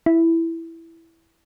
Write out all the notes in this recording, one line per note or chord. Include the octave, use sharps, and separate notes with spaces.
E4